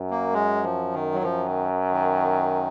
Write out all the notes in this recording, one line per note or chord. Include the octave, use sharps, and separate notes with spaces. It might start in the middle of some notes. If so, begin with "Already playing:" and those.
Already playing: F#2
A#3
G#3
F3
D#3
F#3
F#2 F3
D#3
D#3